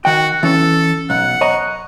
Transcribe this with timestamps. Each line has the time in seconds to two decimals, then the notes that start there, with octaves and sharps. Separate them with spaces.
0.05 D#3 F#4 G5
0.43 E3 C#4 A4
1.10 B1 F#5
1.41 C#5 D#5 A#5